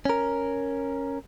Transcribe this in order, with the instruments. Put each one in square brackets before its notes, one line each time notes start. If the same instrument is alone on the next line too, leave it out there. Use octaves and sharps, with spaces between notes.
[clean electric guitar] C#4 A#4